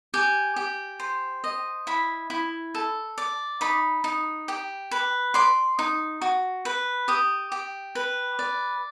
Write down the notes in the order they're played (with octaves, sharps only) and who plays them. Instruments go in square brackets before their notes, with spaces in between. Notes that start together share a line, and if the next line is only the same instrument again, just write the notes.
[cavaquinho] G4 G#5
G4
C5
D#5
E4 B5
E4
A4
D5
D#4 B5
D#4
G4
B4
D5 C6
D#4
F#4
B4
G4 D#6
G4
B4
D5